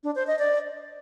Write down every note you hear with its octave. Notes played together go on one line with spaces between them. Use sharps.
D4
C5
D#5
D5